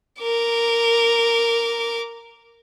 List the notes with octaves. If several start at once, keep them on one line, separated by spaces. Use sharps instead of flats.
A#4 D6